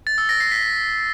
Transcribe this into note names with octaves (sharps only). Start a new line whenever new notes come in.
A6
E6
A#6
C7
B6